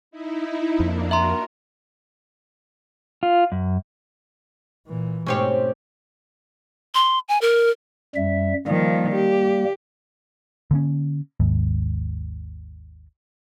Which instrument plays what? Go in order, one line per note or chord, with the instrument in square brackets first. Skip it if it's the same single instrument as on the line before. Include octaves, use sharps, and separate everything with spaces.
[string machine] D#4 E4
[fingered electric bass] F2 [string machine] A#3 D4
[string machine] F#4 A#4 [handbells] E5 A#5 C6
[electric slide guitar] F4
F#2
[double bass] A#2 E3
[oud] G#2 C4 C#5 [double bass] B2 A3 [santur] C#4 G4
[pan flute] C6
G#5
A#4
[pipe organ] F#2 G3 E5
[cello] D#3 F3 [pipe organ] G3 A#3
[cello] G4
[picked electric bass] D3 A#3 C#4
G#1 D#2 G#2